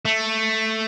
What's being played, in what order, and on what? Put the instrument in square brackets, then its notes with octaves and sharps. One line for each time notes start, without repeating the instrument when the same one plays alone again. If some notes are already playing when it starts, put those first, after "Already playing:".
[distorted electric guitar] A3